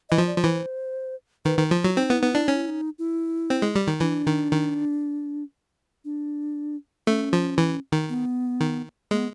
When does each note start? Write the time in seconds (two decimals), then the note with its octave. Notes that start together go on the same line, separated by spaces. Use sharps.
0.09 E3 D#5
0.18 F3
0.27 D5
0.37 F3
0.44 E3 C5
1.45 D#3 B4
1.58 D#3
1.71 F3 F4
1.84 F#3
1.96 C4 D#4
2.09 B3 E4
2.20 B3 D#4
2.32 D4 E4
2.44 C#4 D#4
2.56 E4
2.68 D#4
2.99 E4
3.50 C4
3.62 G#3
3.75 G3
3.87 D#3
4.00 E3 D4
4.27 D#3
4.52 D#3
6.05 D4
7.07 A3 C#4
7.33 F3
7.58 E3
7.92 D#3
8.09 B3
8.60 D#3
9.11 G#3 A#3
9.18 B3